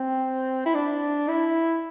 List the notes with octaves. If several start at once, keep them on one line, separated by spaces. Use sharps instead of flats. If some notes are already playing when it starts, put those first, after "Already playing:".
Already playing: C4
E4
D4
E4